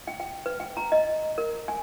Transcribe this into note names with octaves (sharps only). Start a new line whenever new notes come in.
G5
G5
B4
G5
A#5
D#5
A#4
G#5